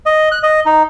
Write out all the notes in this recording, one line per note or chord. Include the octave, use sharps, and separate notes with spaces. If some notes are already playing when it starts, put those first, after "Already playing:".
D#5
F#6
D#5
D#4